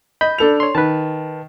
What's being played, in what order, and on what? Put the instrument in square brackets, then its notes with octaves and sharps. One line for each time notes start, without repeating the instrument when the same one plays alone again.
[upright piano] D#5 [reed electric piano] B5 G6
[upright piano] D4 A4 F7
[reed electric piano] C#5 C6
[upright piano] D#3 [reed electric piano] B4 A5